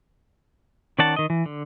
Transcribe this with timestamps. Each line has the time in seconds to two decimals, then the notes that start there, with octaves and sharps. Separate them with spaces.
0.99 D#3 C#4 D5 F#5 A5
1.16 D#3 D#5
1.30 E3
1.46 D3